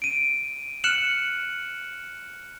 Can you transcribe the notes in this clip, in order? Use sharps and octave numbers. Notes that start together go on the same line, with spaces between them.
D7 D#7
F6 F#6 C#7 E7 F#7